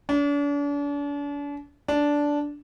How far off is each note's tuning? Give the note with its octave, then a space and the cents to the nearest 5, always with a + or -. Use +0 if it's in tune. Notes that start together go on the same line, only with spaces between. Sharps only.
D4 -40
D4 -10